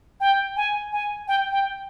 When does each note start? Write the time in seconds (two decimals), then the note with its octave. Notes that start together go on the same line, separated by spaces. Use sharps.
0.20 G5
0.56 G#5
0.92 G#5
1.28 G5
1.52 G5